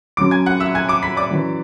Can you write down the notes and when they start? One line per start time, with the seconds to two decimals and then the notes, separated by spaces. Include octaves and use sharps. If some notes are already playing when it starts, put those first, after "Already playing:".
0.17 F#2 C#3 F#3 D6 D7
0.31 G#5 G#6
0.46 F#5 F#6
0.60 E5 E6
0.75 G#5 G#6
0.89 D6 D7
1.03 B5 B6
1.17 D5 D6
1.31 F#2 E3